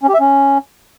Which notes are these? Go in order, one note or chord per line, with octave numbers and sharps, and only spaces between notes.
C#4
G4
E5
C#4